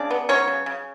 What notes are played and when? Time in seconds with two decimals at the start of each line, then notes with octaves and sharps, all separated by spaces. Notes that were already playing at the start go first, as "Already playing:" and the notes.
Already playing: C#3 D4 D5
0.10 B3
0.29 F#3 C#4 C#5
0.48 C#3
0.66 C#3